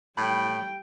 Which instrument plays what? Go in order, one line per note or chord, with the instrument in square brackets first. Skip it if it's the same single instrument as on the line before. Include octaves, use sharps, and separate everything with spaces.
[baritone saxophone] A2 [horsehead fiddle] G3 G5 [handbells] B5